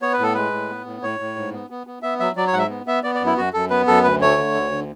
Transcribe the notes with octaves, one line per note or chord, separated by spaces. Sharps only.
B3 C#5
B4
A2 A4
G#3 B4
A2
B3
A2
A2 C#5
A2
G#2
B3
B3
B3
B3 E5
F#3 E5
F#3 D5
C#5
G#2 F#5
E5
B3
B3 E5
B3 D5
D5
F#2
E4
F#2 F#4
F#2 A4
B3 B4
F#2 A4
D2 B4
A3 C#5
D3
D2
D3